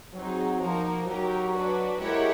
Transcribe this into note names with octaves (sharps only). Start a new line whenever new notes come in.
F#3 C4 D#4 G#4
F3 A#3 D#4 F#4 A#4
F#3 D#4 G4 A#4
D4 F#4 B4
G#3 E4 G4 A#4 C#5 F#5